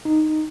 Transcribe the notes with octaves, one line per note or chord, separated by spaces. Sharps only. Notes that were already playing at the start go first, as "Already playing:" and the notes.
D#4